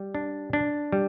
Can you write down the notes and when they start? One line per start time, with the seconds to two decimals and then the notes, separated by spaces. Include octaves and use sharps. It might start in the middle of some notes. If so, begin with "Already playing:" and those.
Already playing: G3
0.15 D4
0.53 D4
0.92 G3